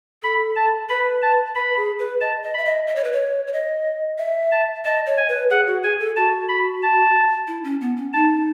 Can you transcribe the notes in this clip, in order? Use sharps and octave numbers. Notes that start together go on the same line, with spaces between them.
A4 B5
A5
B4 B5
A5
B4 B5
G#4
B4
D#5 A5
D#5
E5 B5
D#5
D#5
C#5
B4
C#5
C#5
D#5
E5
A5
D#5 A5
C#5
G#5
B4
G#4 F#5
F#4
G#4 G#5
A4
F#4 A5
B5
A5
E4
C#4
B3
C#4
D#4 A5